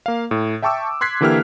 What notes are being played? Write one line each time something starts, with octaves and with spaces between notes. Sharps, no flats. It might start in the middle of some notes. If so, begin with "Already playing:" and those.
A#3 F5
A2
E5 G5 A5 C#6 D6 E6
C6 F#6 G#6 B6 C7
D3 E3 A#3 E4 G4 F6